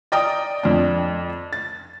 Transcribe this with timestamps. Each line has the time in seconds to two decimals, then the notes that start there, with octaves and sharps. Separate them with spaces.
0.12 D5 D#5 G5 A#5 D#6
0.63 F2 D4
1.53 A6